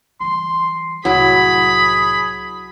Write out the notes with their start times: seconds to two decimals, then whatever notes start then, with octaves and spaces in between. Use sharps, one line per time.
0.20 E3 G3 C6
1.05 C2 A2 F#3 E4 G#4 B5